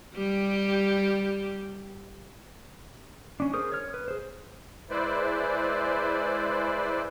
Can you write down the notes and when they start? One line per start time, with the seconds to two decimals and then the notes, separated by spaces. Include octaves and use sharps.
0.14 G3 G4
3.40 C#4 D4
3.53 G#4 A#4 C5 D#6
3.72 C#5 F6
3.94 B4
4.08 G#4 C5
4.90 G#3 E4 B4 C5 D5